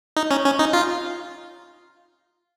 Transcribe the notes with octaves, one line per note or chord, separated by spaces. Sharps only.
D#4
C#4
C#4
D#4
F4